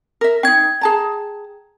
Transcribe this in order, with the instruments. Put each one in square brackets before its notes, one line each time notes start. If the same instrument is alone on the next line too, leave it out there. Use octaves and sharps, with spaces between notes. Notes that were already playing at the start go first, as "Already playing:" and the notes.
[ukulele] A#4 E5
[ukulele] C#4 D#4 [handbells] G5 G#6
[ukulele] G#4 A5 A#5